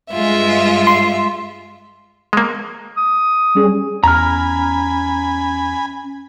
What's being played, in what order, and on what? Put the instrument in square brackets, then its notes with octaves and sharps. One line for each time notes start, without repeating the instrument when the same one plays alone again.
[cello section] G2 G#3 [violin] F4 E5
[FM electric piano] C6
[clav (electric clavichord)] G#3 A#3
[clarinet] D#6
[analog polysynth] G3 C#4 G#4
[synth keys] E2 [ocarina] C#4 [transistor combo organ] G#5 B5 [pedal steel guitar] A#5 F6